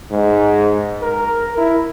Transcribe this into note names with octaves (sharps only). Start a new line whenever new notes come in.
G#2
A#4
E4